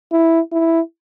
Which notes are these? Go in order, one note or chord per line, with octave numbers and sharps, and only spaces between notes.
E4
E4